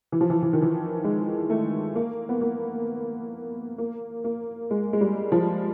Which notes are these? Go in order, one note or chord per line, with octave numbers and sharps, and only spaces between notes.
E3
F3
E3
E3
D#3
E3
G#3
A3
A#3
B3
A#3
A#3
A#3
G#3
G#3
G3
F3